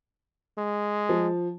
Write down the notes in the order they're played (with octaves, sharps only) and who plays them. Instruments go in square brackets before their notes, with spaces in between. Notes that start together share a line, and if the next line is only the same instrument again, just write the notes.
[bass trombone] G#3
[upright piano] F3